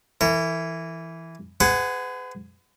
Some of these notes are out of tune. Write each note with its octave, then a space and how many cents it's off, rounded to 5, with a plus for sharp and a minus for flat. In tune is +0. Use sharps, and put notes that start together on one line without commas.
E3 +0 A#4 -45
G#4 +0 B4 +45 F#5 +5